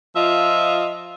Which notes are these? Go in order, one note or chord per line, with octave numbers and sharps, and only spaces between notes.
F3 F4 D#5 E5